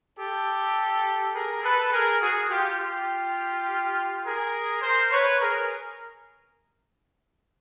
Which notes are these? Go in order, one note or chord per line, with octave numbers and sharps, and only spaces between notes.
G4 A4
G#4 A#4
A4 B4
G#4 A#4
F#4 G#4
F4 G4
F4 G4
G#4 A#4
A#4 C5
B4 C#5
G#4 A#4